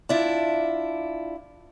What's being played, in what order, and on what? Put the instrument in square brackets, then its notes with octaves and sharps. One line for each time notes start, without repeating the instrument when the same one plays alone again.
[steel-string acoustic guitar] D4 E4 F4